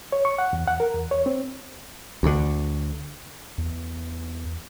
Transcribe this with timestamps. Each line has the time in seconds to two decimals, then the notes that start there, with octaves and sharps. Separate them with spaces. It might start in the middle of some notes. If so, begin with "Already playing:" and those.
0.12 C#5
0.25 C#6
0.38 F#5
0.53 E2
0.68 F#5
0.80 A#4
0.94 E2
1.11 C#5
1.26 C4
2.23 D2 D3
3.58 E2